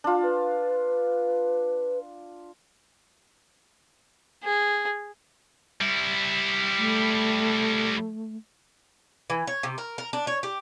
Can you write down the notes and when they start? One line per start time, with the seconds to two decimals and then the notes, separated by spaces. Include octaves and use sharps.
0.04 D4 F4
0.23 B4
4.43 G#4
5.81 G3 E4
6.77 A3
9.30 E3
9.47 C#5
9.63 C3
9.78 A#4
9.98 A#4
10.13 D4
10.27 C#5
10.43 G4